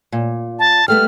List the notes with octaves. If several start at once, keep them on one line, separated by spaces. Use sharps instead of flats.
A#2
A5
G3 A3 B3 F6